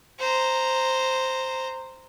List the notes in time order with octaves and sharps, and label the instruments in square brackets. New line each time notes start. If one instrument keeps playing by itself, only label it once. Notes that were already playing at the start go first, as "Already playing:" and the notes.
[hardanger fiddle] C5 A#5